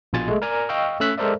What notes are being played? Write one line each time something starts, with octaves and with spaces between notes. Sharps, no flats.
A#1 B2 F4 G#5 A6
G#3 A3
A#4 D5 G#5 A#5
D#5 F5 G5 C#6 E6
A3 C#4 E6 F#6 B6
G#3 A4 A#4 C5 D5 E5